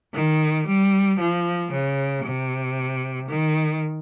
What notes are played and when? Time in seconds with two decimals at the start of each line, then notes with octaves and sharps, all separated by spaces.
0.15 D#3
0.67 G3
1.19 F3
1.71 C#3
2.23 C3
3.27 D#3